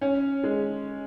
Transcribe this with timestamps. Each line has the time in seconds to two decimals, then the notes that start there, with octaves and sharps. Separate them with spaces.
0.01 C#4
0.44 G#3